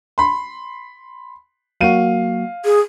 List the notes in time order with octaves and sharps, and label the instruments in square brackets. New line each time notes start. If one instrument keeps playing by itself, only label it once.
[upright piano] B5 C6
[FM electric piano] F#3 A#3 F#4 [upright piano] F5 D#7
[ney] G#4